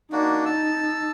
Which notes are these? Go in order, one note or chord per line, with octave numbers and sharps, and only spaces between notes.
A#3 D4 D#4 F#4
A5 E6